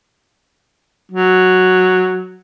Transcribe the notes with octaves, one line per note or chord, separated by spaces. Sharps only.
F#3